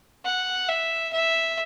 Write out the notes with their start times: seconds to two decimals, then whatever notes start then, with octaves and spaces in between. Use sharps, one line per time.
0.25 F#5
0.68 E5
1.12 E5